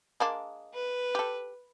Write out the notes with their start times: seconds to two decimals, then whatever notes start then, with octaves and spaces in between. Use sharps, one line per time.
0.20 G#3 A#3 D4
0.74 B4
1.15 G4 A4